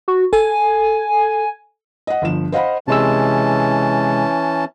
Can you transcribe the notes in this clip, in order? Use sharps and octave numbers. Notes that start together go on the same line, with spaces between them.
F#4
A4 G#5
D#5 F#5
G1 F3 E7
C5 D#5 F5 F#5 B5
C3 E3 G#3 C#4 A5 E6